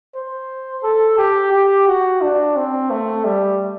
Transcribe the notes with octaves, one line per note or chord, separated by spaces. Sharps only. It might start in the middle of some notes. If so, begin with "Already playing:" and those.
C5
A4
G4
G4
F#4
D4
C4
A3
G3